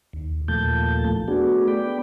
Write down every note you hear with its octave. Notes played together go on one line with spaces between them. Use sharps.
D#2
D#2 A#2 F3 A3 A5 G6
A3 B3 D4 F#4 G#4
B3 D5 G5 B5